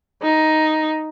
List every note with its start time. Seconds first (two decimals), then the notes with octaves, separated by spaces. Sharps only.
0.23 D#4